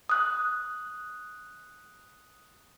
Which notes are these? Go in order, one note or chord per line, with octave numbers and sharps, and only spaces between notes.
D#6 F#6